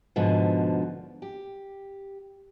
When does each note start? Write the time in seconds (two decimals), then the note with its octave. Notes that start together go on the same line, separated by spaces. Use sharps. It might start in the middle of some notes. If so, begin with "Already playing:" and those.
0.16 G#2 B2 D3 F3
1.22 G4